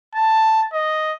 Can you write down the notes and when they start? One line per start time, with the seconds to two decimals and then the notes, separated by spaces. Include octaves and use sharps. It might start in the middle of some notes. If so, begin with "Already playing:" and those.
0.15 A5
0.73 D#5